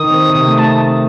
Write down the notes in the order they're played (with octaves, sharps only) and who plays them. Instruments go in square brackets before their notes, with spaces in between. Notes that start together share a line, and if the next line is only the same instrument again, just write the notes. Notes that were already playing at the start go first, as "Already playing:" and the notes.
Already playing: [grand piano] D#3 [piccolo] D#6
[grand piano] C4
C3
A3
[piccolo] A5